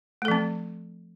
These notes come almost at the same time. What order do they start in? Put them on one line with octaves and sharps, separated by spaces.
A3 A4 F3 C4